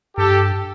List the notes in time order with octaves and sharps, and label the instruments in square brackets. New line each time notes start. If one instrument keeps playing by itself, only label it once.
[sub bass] G2 [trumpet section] G4 A4